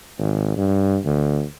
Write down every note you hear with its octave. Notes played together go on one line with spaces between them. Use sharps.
G#1
G2
D2